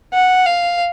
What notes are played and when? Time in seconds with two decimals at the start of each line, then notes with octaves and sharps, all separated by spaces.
0.14 F#5
0.46 F5